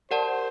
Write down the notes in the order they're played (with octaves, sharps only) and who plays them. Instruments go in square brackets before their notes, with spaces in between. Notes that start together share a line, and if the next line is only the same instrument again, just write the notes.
[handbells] G4 A#4 D5 F#5 A5 [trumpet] C5